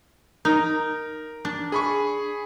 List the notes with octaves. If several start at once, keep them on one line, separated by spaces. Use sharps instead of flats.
D#4 A#4
D4
G#4 B5 C#6